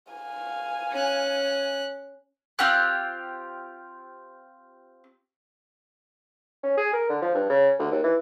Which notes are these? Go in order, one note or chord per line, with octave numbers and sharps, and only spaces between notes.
F5 G#5
C#4 F#6
C4 F4 G4 F#6
C#4
G#4
A#4
D3
F3
G2
C#3
D2
D#2
E3